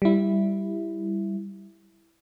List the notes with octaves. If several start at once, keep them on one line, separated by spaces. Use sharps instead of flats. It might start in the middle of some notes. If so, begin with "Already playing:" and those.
G3 E4